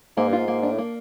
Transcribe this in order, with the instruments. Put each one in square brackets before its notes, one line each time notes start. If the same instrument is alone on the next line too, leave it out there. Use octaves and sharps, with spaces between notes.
[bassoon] G#2 [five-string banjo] A#3
[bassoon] G2 [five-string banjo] F4
[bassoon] G#2
[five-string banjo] A#3
D4
[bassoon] A2
[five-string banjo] A#3